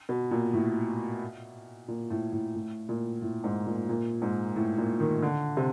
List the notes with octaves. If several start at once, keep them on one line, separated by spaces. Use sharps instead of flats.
B2
A#2
A2
A#2
A2
A2
A2
A#2
A2
G#2
A#2
A#2
G#2
A2
A#2
D#3
D3
C3